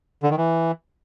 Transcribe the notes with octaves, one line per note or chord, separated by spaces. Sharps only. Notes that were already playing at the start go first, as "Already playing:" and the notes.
D3
D#3
E3